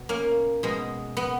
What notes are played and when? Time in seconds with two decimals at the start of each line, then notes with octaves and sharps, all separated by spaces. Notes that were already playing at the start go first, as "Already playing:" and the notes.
Already playing: B2
0.09 A#3 C#4
0.63 B2 G#3
1.17 B3